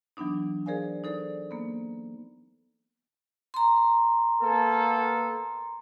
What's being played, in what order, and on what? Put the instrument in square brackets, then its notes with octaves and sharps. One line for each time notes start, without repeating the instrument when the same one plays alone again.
[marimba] E3 F#3 B3 D4 D#4
G#4 A#4 C5 D5 F5 G#5
D#4 A4 C5 D5
A#3 B3
[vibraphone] A#5 C6
[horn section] A#3 B3 A4